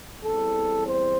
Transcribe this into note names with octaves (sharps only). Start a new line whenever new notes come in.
E2 E3 G3 C4 A4
C5